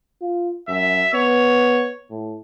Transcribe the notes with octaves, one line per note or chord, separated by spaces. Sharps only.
F4
F#2 E5
B3 C#5
A2